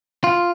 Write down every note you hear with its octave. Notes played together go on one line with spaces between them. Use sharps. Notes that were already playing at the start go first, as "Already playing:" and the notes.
F4